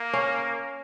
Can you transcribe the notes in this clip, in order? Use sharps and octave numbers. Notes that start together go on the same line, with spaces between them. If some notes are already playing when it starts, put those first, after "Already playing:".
Already playing: A#3
C#4